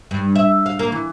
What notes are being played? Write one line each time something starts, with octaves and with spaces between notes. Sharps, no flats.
G2
E5
F5
A#3
E3